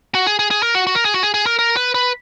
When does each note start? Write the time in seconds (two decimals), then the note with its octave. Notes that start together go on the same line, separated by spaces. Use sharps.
0.15 F#4
0.27 G#4
0.39 G#4
0.51 G#4
0.62 A#4
0.75 F#4
0.87 F#4
0.95 A#4
1.05 G#4
1.14 F#4
1.23 G#4
1.34 G#4
1.46 A#4
1.59 A#4
1.77 B4
1.95 B4